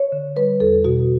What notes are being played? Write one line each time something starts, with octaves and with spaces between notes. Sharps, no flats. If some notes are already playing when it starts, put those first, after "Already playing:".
Already playing: C#5
D3
G3 B4
E2 A4
B2 F#4